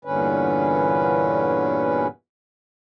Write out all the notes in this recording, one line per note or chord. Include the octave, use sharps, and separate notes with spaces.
E2 G2 A#2 D3 C#4 B4